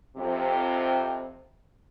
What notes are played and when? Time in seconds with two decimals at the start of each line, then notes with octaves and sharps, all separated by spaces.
0.17 F2 C3